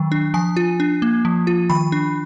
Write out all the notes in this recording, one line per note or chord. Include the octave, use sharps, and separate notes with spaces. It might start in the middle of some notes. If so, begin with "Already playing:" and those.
Already playing: D#3 F#3
D4
F3 G#5
F4
D4
A#3
F3
F4
D#3 B5
D4